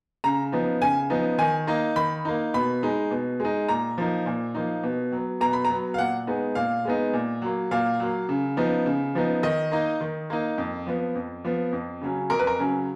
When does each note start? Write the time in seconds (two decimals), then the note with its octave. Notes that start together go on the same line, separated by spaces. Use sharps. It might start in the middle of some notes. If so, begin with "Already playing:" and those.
0.24 C#3 A#5
0.52 F3 B3 D#4
0.82 C#3 G#5
1.10 F3 B3 D#4
1.38 D#3 G#5
1.67 A#3 D#4
1.96 D#3 B5
2.25 A#3 D#4
2.54 B2 B5
2.83 G#3 D#4
3.11 B2
3.40 G#3 D#4
3.68 A#2 A#5
3.98 F3 A#3 D#4
4.26 A#2
4.55 F3 A#3 D#4
4.83 B2
5.12 F#3
5.17 B3
5.40 B2 A#5
5.53 B5
5.65 A#5
5.70 F#3 B3
5.94 F5
5.98 A#2 F#5
6.27 G#3 B3 D#4
6.55 A#2 F5
6.85 G#3 B3 D#4
7.13 A#2
7.42 F#3 A#3
7.71 A#2 F5
8.00 F#3 A#3
8.29 C#3
8.57 F3 B3 D#4
8.86 C#3
9.15 F3 B3 D#4
9.43 D#3 D#5
9.71 A#3 D#4
10.01 D#3
10.30 A#3 D#4
10.58 F2
10.87 F3 B3
11.15 F2
11.44 F3 B3
11.72 F2
12.02 C#3 F#3 C#4
12.30 F2 A#4
12.39 B4
12.47 A#4
12.59 C#3 F#3 C#4